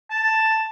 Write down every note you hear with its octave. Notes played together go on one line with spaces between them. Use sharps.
A5